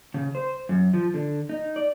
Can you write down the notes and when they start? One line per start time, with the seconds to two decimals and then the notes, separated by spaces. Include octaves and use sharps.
0.14 C#3
0.35 C5
0.69 F#2
0.94 F3
1.14 D3
1.49 D#4
1.76 D5